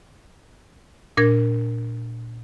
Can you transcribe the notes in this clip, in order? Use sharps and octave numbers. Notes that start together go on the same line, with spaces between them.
A#2 D4 A#4 G#6